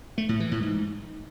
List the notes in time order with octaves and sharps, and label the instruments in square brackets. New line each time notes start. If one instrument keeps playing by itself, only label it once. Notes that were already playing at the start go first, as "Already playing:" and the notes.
[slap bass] A3
A2
E3
A2
G#2